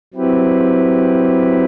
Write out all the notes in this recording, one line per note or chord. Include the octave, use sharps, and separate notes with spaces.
F#3 C4 E4 G4 B4